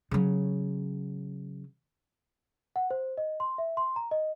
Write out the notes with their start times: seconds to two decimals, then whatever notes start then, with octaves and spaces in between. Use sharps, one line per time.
0.11 C#3 F#3
2.76 F#5
2.91 C5
3.18 D#5
3.40 C6
3.58 E5
3.77 C6
3.96 A#5
4.11 D#5